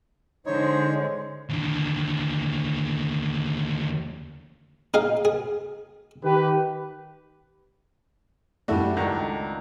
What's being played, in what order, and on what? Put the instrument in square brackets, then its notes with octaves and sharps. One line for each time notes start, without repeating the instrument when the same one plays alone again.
[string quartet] D3 G#3 [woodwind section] D#4 C5 [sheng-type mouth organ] C#5
[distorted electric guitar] D#2 D3
[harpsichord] D#4 G#4 F5
G#4
[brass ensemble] D#3 G4 B4
[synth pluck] F#2 A4 D5 [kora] G3 D4 F#4 [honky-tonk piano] A3 E4
[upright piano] C#2 [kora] D#3 C#4 D4